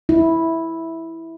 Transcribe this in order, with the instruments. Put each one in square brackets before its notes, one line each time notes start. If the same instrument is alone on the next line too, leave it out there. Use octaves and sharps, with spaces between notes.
[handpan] E4